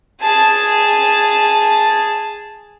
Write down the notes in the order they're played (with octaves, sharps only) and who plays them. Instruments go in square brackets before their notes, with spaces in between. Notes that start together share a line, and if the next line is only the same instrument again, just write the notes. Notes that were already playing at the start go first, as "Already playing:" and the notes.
[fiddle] G#4 A5